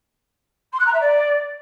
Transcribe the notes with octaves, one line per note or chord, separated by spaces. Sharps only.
C6
F#6
A#5
E5
D5